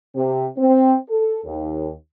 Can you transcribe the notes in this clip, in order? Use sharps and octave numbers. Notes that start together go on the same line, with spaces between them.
C3
C4
A4
D#2